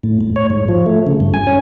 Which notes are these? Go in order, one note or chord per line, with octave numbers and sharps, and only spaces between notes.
A2
A2
C#5
G#2
F3
A3
C#3
G2
G#5
C#4